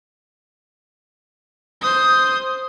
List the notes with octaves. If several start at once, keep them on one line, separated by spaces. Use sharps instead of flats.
C5 D#6